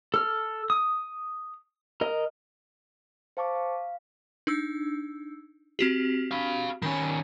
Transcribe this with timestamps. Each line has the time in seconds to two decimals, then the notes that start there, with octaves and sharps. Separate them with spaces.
0.14 A4 F6
0.70 D#6
2.01 A#4 D#5
3.37 C5 F5 A5 C#6 D6
3.55 F5
4.47 D4 D#4 E6
5.79 C4 F#4 G4
6.31 F5 B5
6.82 D#3 C#4 B5